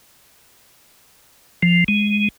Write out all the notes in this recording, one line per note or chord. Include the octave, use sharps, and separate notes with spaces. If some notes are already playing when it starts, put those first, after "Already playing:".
F3
G#3